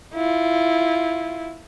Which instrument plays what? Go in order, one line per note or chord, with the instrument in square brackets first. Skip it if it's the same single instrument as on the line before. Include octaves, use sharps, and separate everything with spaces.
[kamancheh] E4 F4